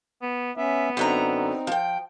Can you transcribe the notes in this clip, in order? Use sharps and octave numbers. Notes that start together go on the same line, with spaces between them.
B3
B3 C#4 E5
F#2 D3 C4 D#4 A#5
F3 G5